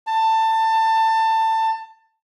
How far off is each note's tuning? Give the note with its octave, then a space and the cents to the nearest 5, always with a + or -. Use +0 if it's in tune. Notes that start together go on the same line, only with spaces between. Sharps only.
A5 +20